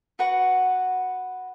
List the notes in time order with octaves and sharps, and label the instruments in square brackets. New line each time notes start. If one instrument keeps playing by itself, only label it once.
[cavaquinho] F#4 B4 F#5 C#6